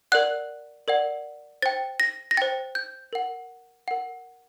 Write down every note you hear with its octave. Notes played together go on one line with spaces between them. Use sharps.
A#4 D5 F#5 F#6
A#4 D5 F#5
C5 G5 A6
A#6
A#6
C5 G5 A6
G6
A#4 F#5
A#4 F#5